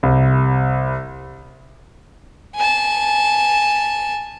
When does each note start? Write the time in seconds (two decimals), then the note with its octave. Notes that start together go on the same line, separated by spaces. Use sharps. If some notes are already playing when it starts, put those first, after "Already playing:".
0.03 C2
2.55 G#5 A5